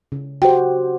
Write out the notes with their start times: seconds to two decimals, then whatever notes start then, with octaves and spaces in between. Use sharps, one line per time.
0.12 C#3
0.42 F#4 G4 C5 G5